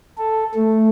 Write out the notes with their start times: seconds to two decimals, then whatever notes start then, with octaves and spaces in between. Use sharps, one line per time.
0.18 A4
0.55 A3